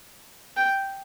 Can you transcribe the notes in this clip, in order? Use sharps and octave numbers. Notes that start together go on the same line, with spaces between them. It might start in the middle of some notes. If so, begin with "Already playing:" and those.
G5